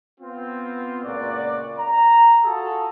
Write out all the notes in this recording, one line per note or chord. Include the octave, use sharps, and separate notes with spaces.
B3 C4 F4
C#2 A#2 F#4 D5
A#5
F4 F#4 G#4 A4